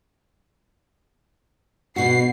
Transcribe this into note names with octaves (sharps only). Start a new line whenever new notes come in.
B2 F#4 C7